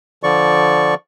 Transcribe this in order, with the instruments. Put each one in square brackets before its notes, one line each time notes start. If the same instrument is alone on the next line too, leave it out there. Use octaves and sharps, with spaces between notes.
[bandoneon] D3 F3 D5 C#6